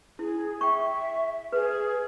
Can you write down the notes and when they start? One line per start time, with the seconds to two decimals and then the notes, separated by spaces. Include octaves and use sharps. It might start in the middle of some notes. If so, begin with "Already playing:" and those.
0.19 E4 G#4
0.61 E5 G5 C#6
1.52 G#4 B4